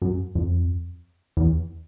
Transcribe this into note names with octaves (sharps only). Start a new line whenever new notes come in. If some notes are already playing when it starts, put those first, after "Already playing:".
F#2
F2
E2